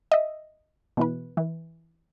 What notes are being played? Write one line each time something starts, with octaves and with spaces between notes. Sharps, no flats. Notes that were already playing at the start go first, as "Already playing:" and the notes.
D#5 E5
B2 E3 B4
E3